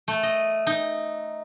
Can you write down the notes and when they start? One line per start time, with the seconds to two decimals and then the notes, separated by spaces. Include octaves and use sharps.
0.08 A3
0.23 D#5
0.67 D#4